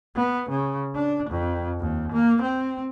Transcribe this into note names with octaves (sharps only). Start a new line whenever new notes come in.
B3
C#3
D4
F2
D#2
A#3
C4